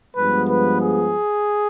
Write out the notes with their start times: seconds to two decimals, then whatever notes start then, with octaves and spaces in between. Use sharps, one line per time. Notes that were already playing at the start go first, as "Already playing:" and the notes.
0.14 G2 F3 G#3 B3 B4
0.47 B4
0.79 G#4